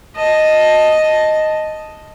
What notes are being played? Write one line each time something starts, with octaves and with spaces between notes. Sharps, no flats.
D#5 A5